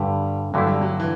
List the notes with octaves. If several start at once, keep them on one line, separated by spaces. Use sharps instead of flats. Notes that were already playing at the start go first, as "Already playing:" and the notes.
Already playing: G2 D3 G3
G2 D3 F#3 A3 E4
G3
F#3
E3